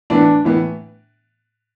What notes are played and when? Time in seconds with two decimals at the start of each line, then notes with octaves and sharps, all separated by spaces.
0.10 A2 E3 B3 D4
0.45 A2 E3 B3